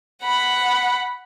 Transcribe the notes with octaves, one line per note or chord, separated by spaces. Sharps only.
F#5 B5